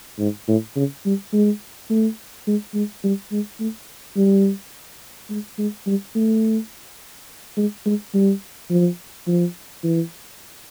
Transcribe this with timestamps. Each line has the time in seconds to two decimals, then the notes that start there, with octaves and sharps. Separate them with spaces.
0.19 G#2
0.48 A2
0.76 C#3
1.05 G3
1.33 G#3
1.90 A3
2.47 G#3
2.74 G#3
3.04 G3
3.32 G#3
3.60 A3
4.17 G3
5.30 G#3
5.59 G#3
5.86 G3
6.15 A3
7.57 G#3
7.86 G#3
8.14 G3
8.70 F3
9.27 F3
9.84 E3